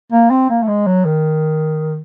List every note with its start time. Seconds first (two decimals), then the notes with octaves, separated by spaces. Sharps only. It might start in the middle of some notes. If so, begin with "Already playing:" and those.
0.12 A#3
0.30 C4
0.49 A#3
0.62 A3
0.68 G#3
0.87 F#3
1.05 D#3